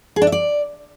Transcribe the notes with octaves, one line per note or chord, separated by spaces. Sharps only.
G#4
D4
E5
D5